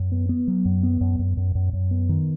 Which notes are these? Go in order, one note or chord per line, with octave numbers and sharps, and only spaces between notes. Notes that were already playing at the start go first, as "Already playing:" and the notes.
Already playing: F#2
B3
B3
F#3
F#2
B3
F#2
F#2
F#2
F#2
F#2
B3
D#3